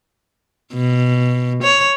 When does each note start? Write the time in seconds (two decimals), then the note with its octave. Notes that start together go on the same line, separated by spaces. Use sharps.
0.73 B2
1.63 C#5